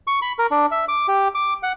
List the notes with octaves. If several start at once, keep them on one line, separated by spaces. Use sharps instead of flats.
C#6
B5
A#4
D4
E5
D6
G4
D6
F#5